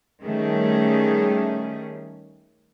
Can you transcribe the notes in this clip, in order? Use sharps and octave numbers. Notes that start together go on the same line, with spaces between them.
D#3 G3 A3 C#4 G#4